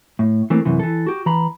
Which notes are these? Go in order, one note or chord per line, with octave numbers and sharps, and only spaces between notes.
A2
E3 A3 A#3 C4
F#2 C3 E3
E3 A4
F#4 G4
E3 A#5 B5